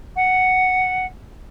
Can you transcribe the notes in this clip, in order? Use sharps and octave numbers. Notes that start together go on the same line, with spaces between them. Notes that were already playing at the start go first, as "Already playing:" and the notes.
F#5